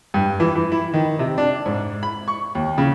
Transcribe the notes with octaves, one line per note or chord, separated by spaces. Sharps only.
G2
E3
E3
E4
D#3
C3
D4
G#2
B5
C#6
D#2
C#3